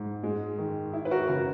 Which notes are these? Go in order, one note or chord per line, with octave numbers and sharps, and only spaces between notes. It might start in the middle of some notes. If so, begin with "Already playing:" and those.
Already playing: G#2
G#3
D#3
E4
B4
F#4 A#4
C#3 F#4